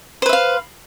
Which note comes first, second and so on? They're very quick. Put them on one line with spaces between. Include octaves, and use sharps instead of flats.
C5 B4 E5 F5